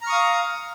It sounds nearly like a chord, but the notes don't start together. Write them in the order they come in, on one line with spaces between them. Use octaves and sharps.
A#5 F6 C#6 D#6 F5